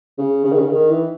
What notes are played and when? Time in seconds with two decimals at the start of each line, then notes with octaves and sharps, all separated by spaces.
0.18 C#3
0.44 C#3
0.52 D#3
0.60 C#3
0.70 D#3
0.90 E3